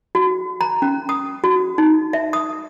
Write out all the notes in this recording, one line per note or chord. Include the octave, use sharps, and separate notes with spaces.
F#4
A#5
C#4
D#6
F#4
D#4
E5
D#6